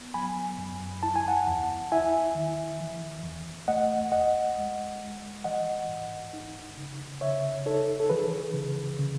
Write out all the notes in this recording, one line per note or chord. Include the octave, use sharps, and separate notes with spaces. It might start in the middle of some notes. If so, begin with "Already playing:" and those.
Already playing: B3
F#3 G#5 B5
F#2
E4 A5
G#5
F#5 A5
E2
E4 E5 G#5
D#3
E3
E2
A3 D#5 F#5
E2 D#5 F#5
G#3
G#3
E3 D#5 F#5
G#2
D#4
C#3
C#3 C#5 E5
D#4 A4 C#5
A4
E3 G#4 B4
C#3
C#3